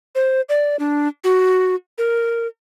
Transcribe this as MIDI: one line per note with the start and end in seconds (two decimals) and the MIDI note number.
0.15 0.41 72
0.49 0.76 74
0.79 1.08 62
1.24 1.75 66
1.98 2.47 70